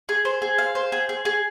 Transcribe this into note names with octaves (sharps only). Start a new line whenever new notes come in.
G#4
C5
G#4
F5
C5
G#4
G#4
G#4